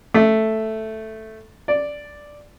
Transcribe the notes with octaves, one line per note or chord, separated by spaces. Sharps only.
A3
D5